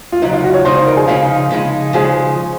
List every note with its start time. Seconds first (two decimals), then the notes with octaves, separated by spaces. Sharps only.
0.12 F4
0.22 F#2 C#3 F#3 D#4
0.33 F4
0.44 F#4
0.54 C#5
0.65 C#3 F3 G#3 D#4 C5
0.76 C5
0.87 A#4
0.97 G#4
1.07 C#3 F3 G#3 D#4 F5
1.51 C#3 F3 G#3 D#4
1.93 C#3 F3 G#3 G#4